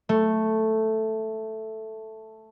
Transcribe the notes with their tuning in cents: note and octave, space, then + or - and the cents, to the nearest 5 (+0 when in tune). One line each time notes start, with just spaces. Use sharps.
A3 +0